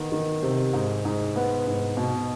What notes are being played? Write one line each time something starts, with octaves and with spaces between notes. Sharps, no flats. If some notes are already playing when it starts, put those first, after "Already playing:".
Already playing: D#3 B3
D#3
C3
G#2
G#2
B3
G#2
B2